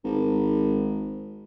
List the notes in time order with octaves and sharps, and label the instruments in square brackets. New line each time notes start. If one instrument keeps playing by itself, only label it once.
[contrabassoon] G#1